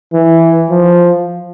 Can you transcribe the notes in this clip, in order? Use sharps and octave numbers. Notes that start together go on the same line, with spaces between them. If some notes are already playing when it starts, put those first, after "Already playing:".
E3
F3